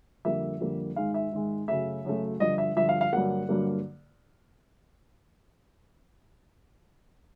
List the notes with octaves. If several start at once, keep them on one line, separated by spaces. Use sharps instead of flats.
F2 D3 G3 A#3 E5
F2 D3 G3 A#3
G#2 D#3 G#3 F5
E5
G#2 D#3 G#3
F#2 C#3 F#3 A3 E5
F#2 C#3 F#3 A3
G2 D3 F3 D#5
E5
G2 D3 F3 E5
F5
F5
G2 D3 F#3 A#3 F#5
G2 D3 F#3 A#3